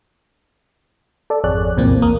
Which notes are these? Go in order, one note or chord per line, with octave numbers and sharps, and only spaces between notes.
A4 D5
G#1 F2 G#4 C#5 D5 F#6
C2 F#2 A#2 E3 A#3 C4
A#1 E2 A#3 A#4 D#6